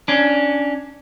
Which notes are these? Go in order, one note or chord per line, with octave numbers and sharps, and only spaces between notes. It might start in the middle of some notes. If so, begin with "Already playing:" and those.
C#4 D4